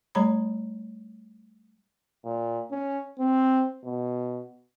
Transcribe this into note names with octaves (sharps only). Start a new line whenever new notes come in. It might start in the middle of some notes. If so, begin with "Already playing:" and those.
G3 A3 C#5 A#5 B5
A#2
C#4
C4
B2